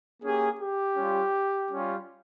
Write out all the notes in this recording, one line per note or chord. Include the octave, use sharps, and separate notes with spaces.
A#3 C#4 G4 G#4
G4
G3 C#4 F4
G3 C#4 F4